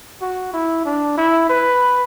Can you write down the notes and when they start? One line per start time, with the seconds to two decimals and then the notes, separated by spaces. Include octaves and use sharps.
0.21 F#4
0.54 E4
0.86 D4
1.18 E4
1.50 B4